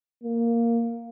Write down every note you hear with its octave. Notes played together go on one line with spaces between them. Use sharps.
A#3